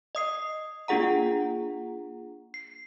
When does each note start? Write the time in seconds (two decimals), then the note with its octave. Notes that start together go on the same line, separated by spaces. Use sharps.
0.15 D#5 D#6 C7
0.88 A#3 D4 F4 G#4 F#5 A#5
2.54 C7